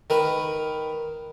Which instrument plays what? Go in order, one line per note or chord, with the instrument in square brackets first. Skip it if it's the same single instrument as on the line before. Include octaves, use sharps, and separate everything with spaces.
[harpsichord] D#3 A#4 B4